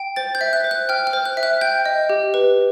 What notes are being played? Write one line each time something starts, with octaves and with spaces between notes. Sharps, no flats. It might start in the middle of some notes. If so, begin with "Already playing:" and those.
Already playing: G5
C5 A6
G6
E5
F#6
C5
F#6
G5 F6
F6
C5
F#6
E5
F#6
G5 G6
D#5
G4
B4